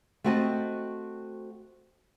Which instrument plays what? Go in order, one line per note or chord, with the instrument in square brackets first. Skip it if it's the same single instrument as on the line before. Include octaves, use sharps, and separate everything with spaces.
[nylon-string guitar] A3 C4 F#4 D#5 A5